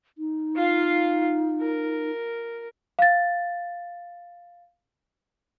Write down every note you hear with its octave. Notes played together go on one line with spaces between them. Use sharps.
D#4
F4 F5
A#4
F5 A6